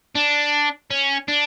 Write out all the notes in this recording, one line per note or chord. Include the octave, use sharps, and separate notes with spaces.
D4
C#4
D4